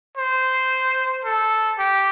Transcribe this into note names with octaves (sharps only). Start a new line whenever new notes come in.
C5
A4
G4